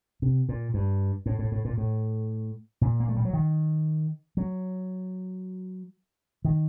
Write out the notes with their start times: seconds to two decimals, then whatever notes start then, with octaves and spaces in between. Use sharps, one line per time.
0.22 C3
0.49 A#2
0.74 G2
1.26 A2
1.39 A2
1.52 A2
1.65 A#2
1.78 A2
2.81 A#2
3.00 A#3
3.09 A3
3.17 G3
3.25 F#3
3.33 D#3
4.37 F#3
6.45 D#3